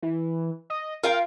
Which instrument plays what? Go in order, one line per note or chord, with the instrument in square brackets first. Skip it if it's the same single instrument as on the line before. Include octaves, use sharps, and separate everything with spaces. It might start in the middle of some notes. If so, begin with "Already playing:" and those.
[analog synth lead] E3
D#5
[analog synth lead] F4 [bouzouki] A#4 F5 G5